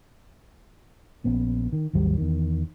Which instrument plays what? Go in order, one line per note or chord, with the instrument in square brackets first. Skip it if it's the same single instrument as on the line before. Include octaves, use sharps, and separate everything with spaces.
[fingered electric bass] A#1 B3 C#4
D#3
G#1 D#2 F#3 G3
E2 D#3